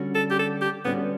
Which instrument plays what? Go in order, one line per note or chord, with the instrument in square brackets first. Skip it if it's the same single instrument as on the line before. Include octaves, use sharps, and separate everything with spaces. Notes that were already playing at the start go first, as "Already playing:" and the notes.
Already playing: [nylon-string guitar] D3 G3 C#4 F#4
[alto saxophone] A4
G4
A4
G4
[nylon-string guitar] D3 G3 C#4 F#4 [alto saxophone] B3